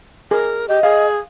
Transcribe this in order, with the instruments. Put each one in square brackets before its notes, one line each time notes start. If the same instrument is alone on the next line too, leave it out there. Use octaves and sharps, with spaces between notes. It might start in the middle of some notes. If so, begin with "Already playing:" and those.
[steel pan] G#4 [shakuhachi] A#4
[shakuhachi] G4 [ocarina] D#5
[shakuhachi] G#4 [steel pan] F5